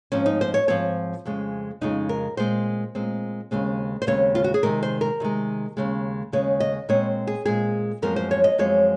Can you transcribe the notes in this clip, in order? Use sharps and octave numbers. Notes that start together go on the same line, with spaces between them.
G#2 F3 C4 C#4
D#4
C5
C#5
G#2 F3 C4 C#5
F2 C#3 G#3
F2 C#3 G#3 D#4
A#4
A#2 G#3 C4 C5
A#2 G#3 C4
D#2 C#3 G#3 C4
C5
D#2 C#3 G#3 C4 C#5
F4
F#4
G#4
C3 D#3 G#3 A#4
C5
A#4
C3 D#3 G#3
D#2 C#3 G#3
D#2 C#3 G#3 C#5
D#5
A#2 G#3 C4 C#5
G#4
A#2 G#3 C4 G#4
F#2 F3 G#3 C4 A#4
C5
C#5
D#5
F#2 F3 G#3 C4 C#5